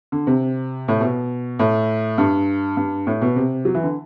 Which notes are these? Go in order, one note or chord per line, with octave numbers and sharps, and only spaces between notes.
D3
C3
A2
B2
A2
G2
G2
A2
B2
C3
F#3
E3
D3